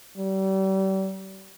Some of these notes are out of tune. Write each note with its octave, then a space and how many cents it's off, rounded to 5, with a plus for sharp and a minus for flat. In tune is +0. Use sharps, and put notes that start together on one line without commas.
G3 -35